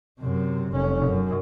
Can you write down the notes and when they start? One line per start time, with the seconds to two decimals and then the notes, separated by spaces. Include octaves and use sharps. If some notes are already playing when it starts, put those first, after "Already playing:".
0.20 F#2 C3
0.73 F1 C#4
1.06 F#2